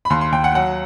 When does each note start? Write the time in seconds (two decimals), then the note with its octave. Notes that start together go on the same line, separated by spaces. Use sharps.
0.05 B5
0.10 D#2 C6
0.21 C6
0.32 D#2 G5
0.44 F#5
0.55 F#3 F#5